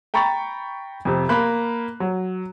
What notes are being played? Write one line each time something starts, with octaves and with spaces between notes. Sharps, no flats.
G5 A#5 B5 C#6 A6
F2 C3
A#3 B5 F#6
F#3